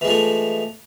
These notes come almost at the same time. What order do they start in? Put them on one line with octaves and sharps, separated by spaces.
E3 G#3 F3 A3